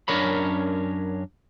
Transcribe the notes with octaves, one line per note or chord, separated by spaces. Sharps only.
F#2 C#4 D4 A#4 C#5 B5